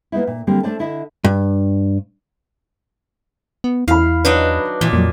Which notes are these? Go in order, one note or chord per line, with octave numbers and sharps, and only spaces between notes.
A#3 B3 D#4 E4
A#2
D3 F#3 G3 A#3 C4 A#4
A3 D4 C5 D5 A5
D3 E4 D#5 E5
G2
B3
E2 E4 F5 B5
F#3 D4 D#4 B4
A#2 E3
F2 F#3 A#3